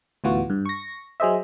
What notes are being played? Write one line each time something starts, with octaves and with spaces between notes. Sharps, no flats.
D2 A2 E3 B3 F4 F#4
G2
C#6 A#6
F#3 G#4 C5 D#5 E5